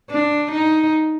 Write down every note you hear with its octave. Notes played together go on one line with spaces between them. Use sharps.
D4
D#4